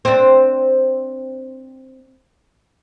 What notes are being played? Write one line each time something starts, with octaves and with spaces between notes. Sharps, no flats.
C4 D4